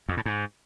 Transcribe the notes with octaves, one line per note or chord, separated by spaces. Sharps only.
F2
A2
G#2